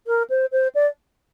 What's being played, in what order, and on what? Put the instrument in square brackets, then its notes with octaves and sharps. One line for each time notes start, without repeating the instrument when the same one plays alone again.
[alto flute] A#4
C5
C5
D5